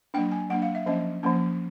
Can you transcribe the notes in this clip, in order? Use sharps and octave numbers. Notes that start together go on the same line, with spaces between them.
F#3 A#3 D4 G5
G#5
F#3 A#3 D4 F#5
F5
E5
F3 A#3 C#4 D#5
F3 A#3 C#4